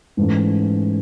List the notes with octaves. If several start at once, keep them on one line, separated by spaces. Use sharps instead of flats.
G#2 E3 A3 C#4